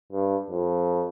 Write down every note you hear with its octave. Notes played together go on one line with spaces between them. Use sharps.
G2
F2